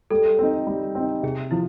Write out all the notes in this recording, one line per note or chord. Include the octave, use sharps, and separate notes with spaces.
G3 A4
C4 D#4
G3
C4 D#4
C3 G#4
F3 E4